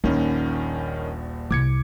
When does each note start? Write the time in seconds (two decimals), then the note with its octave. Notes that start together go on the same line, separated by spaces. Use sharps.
0.04 D#1 A#1 D#3 C#4 D4
1.51 C2 D6 G#6 C#7